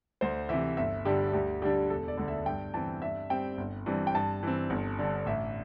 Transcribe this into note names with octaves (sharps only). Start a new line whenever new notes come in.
D2 C5
C3 E3 E5
G1 E5
G2 D3 G3 G4
D2 G4
D3 G3 D4 G4
E1 A4
D5
D2 D3
E5
G2 G5
E3 C4 A5
G2 E5
G3 C4 G5
G1
G2 E3 G3 C4
G5
G2 A5
E3 C4
G1
G2 D3
A1 E5